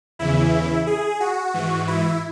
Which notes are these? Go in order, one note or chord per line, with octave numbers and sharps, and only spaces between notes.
E2 C#3 E3 E4
G#4
F#4
G#2 E3
E4